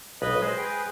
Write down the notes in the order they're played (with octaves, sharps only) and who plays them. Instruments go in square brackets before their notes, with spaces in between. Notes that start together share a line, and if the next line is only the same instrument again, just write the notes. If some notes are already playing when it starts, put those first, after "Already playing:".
[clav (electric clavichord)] B1 [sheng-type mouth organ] B4 D#5 B5
[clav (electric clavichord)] G#3 [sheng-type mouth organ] C5
[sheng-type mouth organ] G#4 B4 G5